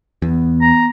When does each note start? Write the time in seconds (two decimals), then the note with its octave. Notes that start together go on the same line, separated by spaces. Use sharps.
0.22 E2 B3
0.61 A#5